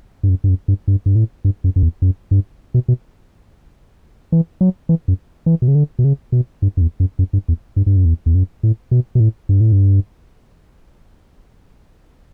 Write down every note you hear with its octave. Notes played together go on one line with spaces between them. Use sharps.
G2
F#2
G2
F#2
G2
G2
G2
A2
G2
F#2
F#2
E2
F#2
G2
B2
B2
E3
F#3
E3
F#2
E3
B2
C#3
D3
B2
C#3
B2
G2
F#2
E2
F#2
F#2
G2
E2
G2
G2
F#2
E2
E2
F#2
A2
B2
B2
A2
G2
A2
G2